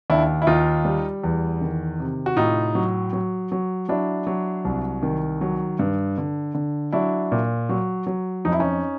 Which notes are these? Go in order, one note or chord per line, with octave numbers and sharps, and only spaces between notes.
D#2 D4 E4
E4
D#2 D#4 F4
G3
E2
D#3
C3
F#4
A2 D#4 F4
F#3
F#3
F#3
F#3 D4 E4
F#3
C2
D#3
F#3
G2
D3
D3
F#3 D4 E4
A#2
F#3
F#3
F2 D#4
E4
C#4 D#4